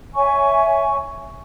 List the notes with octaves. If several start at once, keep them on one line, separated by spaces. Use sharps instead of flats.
C#5 E5 G#5 C#6